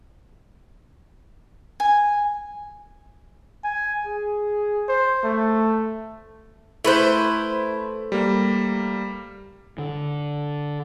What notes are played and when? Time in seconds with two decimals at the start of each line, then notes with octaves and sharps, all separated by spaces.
1.80 G#5
3.64 G#5
4.07 G#4
4.89 C5
5.24 A3
6.84 A3 E4 B4 C5
8.12 G3 A#3
9.78 D3